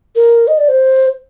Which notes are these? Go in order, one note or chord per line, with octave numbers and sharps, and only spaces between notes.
A#4
D#5
D5
C5